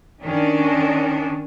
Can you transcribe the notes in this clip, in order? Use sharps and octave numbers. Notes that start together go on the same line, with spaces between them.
D#3 C#4 D4